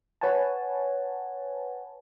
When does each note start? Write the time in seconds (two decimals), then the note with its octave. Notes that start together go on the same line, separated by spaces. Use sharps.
0.21 B4 C#5 F#5 G#5 A5